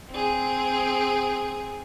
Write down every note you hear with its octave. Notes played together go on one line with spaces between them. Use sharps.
C4 G#4